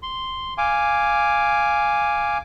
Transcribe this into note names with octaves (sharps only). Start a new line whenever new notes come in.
C6
F5 G#5 D6